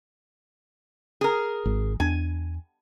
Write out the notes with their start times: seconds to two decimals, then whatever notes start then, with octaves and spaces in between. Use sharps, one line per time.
1.21 G#4 A#4
1.65 G#1
2.00 E2 D4 G#5